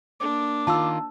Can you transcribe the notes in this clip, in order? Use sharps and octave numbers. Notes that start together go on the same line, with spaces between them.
A#3 D4 D6
D#3 F4 A5 E6